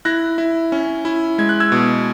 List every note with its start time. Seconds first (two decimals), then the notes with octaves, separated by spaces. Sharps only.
0.05 E4 F#6 A#6
0.38 E4
0.72 C#4
1.05 E4
1.38 G#3 G#6
1.49 F#6
1.60 E6 G#6
1.72 B2